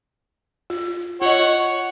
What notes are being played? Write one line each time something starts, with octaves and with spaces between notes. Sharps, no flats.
F4
F4 C#5 D#5 F#5